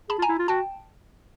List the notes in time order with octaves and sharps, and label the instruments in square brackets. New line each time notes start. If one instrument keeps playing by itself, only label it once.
[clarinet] G#4 [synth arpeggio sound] A5 B5
[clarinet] F4
[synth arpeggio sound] G#5 A#5
[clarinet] E4
F4
[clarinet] F#4 [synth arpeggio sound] G5 A5